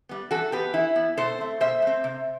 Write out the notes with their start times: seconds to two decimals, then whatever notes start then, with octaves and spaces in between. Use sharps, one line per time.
0.09 G3 B3
0.31 E3 F#4 A4
0.52 B3 G4 B4
0.74 E3 E4
0.96 B3
1.17 B2 A4 C5
1.38 A3 C4
1.60 B2 C5 E5
1.82 A3 C4
2.04 C3